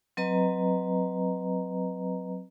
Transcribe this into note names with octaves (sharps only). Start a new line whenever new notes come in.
F#3 C4 B4 D#5 A#5